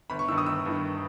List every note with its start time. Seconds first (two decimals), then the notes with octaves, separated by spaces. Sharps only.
0.10 G1 B5
0.19 C#6
0.28 G2 D#3 E6
0.38 D#6
0.46 G1 E6
0.66 G2 D#3